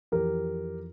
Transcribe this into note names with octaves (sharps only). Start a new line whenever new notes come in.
F2 E3 G4 A#4